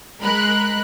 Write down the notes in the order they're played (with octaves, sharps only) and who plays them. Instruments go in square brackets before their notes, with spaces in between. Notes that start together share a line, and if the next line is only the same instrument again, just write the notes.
[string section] G#3 A#4 B5 F#6